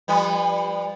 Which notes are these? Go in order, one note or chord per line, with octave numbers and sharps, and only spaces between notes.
F3 G3 B4